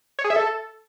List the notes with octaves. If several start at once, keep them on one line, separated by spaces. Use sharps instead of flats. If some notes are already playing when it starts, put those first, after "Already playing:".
C#5
G#4
E5
A4